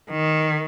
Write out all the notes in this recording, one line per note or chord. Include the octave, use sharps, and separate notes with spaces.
D#3